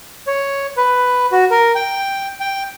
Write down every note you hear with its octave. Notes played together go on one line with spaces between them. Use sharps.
C#5
B4
F#4
A#4
G5
G5